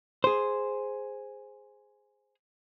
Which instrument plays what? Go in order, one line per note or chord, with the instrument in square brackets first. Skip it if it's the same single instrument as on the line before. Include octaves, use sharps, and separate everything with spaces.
[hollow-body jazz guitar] G#4 C5